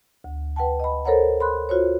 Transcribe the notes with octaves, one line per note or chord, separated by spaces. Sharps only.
D2
B4 F#5 G5 A5
D#5 B5
A4 A#4 C5 C#5 F#5 A#5
B5 C6 F#6
F4 F#4 C5 C#5